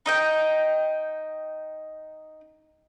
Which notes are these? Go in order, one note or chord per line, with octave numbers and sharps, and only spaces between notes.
D#4 D#5 G5